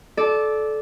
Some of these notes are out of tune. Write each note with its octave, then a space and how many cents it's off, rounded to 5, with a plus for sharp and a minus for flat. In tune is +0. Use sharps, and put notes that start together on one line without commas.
A4 -20 D5 +0